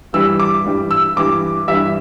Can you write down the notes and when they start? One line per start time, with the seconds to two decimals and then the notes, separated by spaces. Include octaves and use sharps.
0.13 G2 E3 G3 E6
0.40 D6
0.64 G2 E3 G3
0.91 E6
1.16 G2 E3 G3 D6
1.67 G2 E3 G3 E5